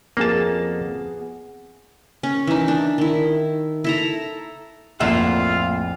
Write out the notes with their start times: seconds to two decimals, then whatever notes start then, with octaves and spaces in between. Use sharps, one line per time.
0.17 F2 A#3 B3 F#4 G#4 A5
2.23 C#4
2.47 E3 D#4
2.68 D4
2.98 D#3 E4
3.84 E4 A4 A#5
5.00 A#1 F2 A2 A#3 F4 E5 F#5